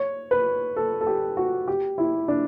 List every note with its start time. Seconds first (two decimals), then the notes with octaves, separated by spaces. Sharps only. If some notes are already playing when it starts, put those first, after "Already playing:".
Already playing: C#5
0.31 B4
0.76 A4
1.01 A4
1.07 G4
1.37 F#4
1.68 G4
1.98 E4
2.28 D4